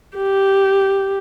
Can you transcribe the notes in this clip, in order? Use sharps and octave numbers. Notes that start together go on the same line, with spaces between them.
G4